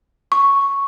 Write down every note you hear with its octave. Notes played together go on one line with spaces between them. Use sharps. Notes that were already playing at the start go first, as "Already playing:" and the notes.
C#6